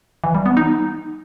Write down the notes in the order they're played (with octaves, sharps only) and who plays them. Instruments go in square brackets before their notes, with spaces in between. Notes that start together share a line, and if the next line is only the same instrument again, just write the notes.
[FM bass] E3
G3
B3
D#4